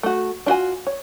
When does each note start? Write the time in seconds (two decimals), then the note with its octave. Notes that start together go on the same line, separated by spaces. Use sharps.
0.03 A3 F#4
0.46 D4 F4 F#4 G#5
0.87 C#5